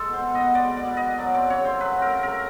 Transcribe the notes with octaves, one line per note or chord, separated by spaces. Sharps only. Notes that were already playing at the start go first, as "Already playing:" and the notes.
Already playing: G#3 A4
B2 C5
B2
D#5
B3
G#3 D5
B2
D5
B2
D#5
B3
F#3 D5
C4 D5
C#3 C#5
A3 C5
F#3 B4
C4 A#4
C#3
A#4
A3